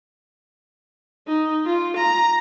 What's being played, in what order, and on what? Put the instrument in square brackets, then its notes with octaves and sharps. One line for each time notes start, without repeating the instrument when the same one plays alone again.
[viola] D#4
F4
A#5